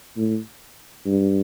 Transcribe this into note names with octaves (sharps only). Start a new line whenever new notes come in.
A2
G2